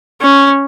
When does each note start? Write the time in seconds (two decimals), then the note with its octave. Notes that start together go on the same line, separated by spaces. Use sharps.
0.21 C#4